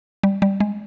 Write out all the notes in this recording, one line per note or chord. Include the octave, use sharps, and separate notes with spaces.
G3
G3
G#3